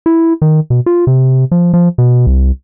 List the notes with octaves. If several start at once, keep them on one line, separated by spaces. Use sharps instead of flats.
E4
D#3
B2
F4
C3
F3
F3
B2
C2